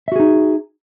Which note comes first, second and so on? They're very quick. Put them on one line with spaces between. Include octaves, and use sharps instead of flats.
E5 F#4 G#4 D#4